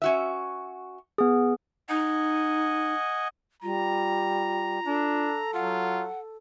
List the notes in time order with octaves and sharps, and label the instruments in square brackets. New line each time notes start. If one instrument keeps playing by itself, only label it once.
[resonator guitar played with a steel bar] C#4 F#4 E5
[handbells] B3 G#4
[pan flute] D#4 [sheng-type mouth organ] D#5 F#5 G#5
[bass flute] G3 [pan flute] F4 [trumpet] A#5
[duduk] D4 [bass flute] A4
[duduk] F#3 [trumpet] F4 [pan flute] F#5